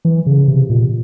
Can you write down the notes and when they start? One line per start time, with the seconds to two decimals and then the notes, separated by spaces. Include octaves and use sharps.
0.05 E3
0.26 C#3
0.48 C3
0.70 A#2